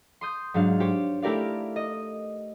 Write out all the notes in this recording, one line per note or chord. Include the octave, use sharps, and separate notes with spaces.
C6 D#6 G6
G#2 F#3 D4 F5
G4 C5 C#5
A3 E4 G4 A#4 D5 F5
D#5